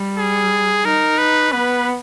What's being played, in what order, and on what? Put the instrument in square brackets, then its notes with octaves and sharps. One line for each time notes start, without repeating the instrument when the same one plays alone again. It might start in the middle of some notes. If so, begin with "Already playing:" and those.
Already playing: [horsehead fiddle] G3
[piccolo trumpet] G#4
[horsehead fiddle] D#4 [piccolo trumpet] A#4
[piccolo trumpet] B4
[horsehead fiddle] B3 [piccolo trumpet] B4